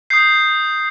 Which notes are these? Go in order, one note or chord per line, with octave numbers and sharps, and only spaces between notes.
D#6 G6 C7